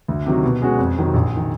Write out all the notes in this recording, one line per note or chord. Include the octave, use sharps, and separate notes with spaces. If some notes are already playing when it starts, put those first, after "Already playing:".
D2
C3 D#3 F#3
B2
G#3 C#4 F#4
F2
C3 D#3 F#3
A#1
D#3